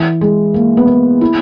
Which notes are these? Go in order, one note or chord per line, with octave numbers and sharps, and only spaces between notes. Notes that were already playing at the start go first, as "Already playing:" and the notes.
Already playing: E3
G#3
A#3
B3
A#3
E4